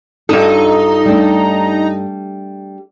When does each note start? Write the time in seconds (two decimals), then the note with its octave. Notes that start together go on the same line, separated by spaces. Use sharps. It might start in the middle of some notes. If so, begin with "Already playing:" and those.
0.29 G2 D4 D#4 F4 F#4 A4
1.06 G3 A3 D4